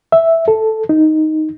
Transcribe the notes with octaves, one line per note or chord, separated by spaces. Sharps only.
E5
A4
D#4